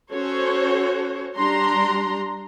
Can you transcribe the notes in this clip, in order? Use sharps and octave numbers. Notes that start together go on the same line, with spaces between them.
C#4 F#4 A4 C5 C#5
G3 D4 A#5 C6